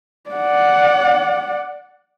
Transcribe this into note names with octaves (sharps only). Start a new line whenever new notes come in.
D5 F#5